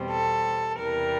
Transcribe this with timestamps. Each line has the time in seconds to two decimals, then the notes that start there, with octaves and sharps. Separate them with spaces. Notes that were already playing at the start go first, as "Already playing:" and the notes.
Already playing: E2 B2 G3 C4
0.11 A4
0.79 E2 C3 E3 G3 A#4